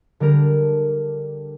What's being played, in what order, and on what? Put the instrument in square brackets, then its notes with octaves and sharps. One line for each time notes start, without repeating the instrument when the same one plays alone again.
[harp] D3 G3 D4 A#4